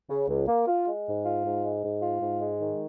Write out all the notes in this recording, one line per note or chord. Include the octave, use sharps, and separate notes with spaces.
C#3
C#2
A#3
F4
G#3
G#2
F4
G#2
G#3
G#2
F4
G#2
G#3
D#3